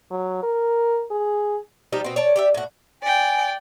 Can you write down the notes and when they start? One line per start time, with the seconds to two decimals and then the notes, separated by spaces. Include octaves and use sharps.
0.11 F#3
0.43 A#4
1.11 G#4
1.92 F3 G3 D#4 G4
2.04 B2 C4
2.16 C#5 D5 A5
2.36 G4 D5 E5
2.54 A2 F#4
3.03 D5 G5 G#5